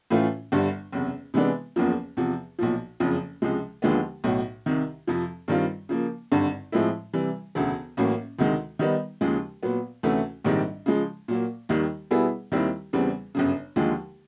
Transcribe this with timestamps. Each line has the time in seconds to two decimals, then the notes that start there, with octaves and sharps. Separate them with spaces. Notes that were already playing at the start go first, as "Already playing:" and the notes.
0.10 A2 E3 A3 C#4 F4
0.52 G1 G2 D3 G3
0.92 F#1 E2 C3
1.34 C3 E3 G#3 B3 D4
1.76 F#1 E2 C#3 F3 A#3
2.17 E2 C3 F3
2.59 B1 A#2 F3
3.00 F#1 F2 C#3 F3
3.42 C#2 C3 F3 G#3
3.82 D#2 D3 F3 G#3 B3
4.24 B1 A2 F#3
4.66 C2 C3 D#3
5.07 F2 C3 F3
5.48 G2 D#3 G3 C4 F4
5.89 C#3 F3 A#3
6.32 G#1 G2 D3
6.72 A2 F3 G#3 C4 E4
7.14 C3 E3 G3
7.55 E1 D2 C#3
7.97 A1 A2 F#3 A#3 C#4
8.39 D2 C3 D#3 G#3
8.79 D#3 G3 B3 D#4
9.21 D#2 C#3 F3 G#3
9.63 A#2 F#3 B3
10.03 D2 C3 E3 A3 C#4
10.45 A#1 G#2 D#3 G3 C4
10.86 C#3 F3 G#3
11.28 A#2 F#3 A#3
11.69 D#2 D#3 G3
12.11 B2 G3 B3 E4 G#4
12.52 D#2 D#3 G3 C4 E4
12.93 E2 C#3 E3 G3 C4
13.35 G1 F#2 C#3
13.76 D#2 D3 F3 G#3